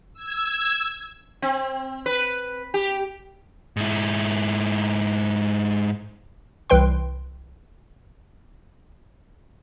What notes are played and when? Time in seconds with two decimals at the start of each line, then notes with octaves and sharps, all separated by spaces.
0.14 E6 G#6
1.42 C4
2.06 B4
2.74 G4
3.77 G#2 E4
6.70 C2 E3 B4 G5 C6